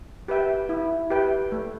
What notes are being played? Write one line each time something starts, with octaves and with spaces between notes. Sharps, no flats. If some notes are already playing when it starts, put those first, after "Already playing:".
G4 B4 E5 G5
E4
G4 B4 E5 G5
A3